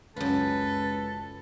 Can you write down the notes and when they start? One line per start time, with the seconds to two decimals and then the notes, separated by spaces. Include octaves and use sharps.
0.17 C#2 F#2 F4 A4 B4